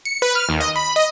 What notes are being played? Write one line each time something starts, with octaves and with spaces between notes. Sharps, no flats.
C#7
B4
F6
D#2
D#5
B5
D#5